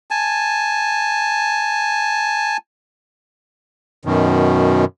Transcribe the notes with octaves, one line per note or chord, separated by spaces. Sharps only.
G#5 A5
F#2 B2 D#3